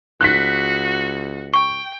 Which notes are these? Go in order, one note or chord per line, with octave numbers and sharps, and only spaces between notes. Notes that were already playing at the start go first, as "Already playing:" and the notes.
C#2 F#4 F#6 B6
G5 C#6